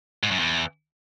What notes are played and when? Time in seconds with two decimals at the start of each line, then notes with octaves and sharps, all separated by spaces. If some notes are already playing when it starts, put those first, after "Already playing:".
0.23 G#2
0.31 F#2
0.39 E2